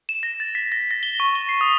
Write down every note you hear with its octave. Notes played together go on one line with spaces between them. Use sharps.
E7
A#6
A6
B6
A#6
A#6
G7
C#6
G7
C7
D#6